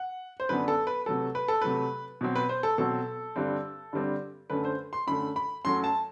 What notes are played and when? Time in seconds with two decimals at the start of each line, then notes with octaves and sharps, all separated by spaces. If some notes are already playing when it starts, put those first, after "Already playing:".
Already playing: F#5
0.40 C5
0.49 F#2 D3 F#3 B3 D4 B4
0.68 A4
0.87 B4
1.06 C3 F#3 A3 A4
1.35 B4
1.48 A4
1.62 C3 F#3 A3 B4
2.21 B2 F#3 C4
2.36 B4
2.49 C5
2.63 A4
2.78 B2 F#3 C4 A4
3.36 G2 D3 G3 C4
3.93 G2 D3 G3 C4
4.50 F#2 D3 A3 B4
4.65 C5
4.93 C6
5.07 F#2 D3 A3 B5
5.36 B5
5.65 F#2 F#3 A3 C6
5.84 A5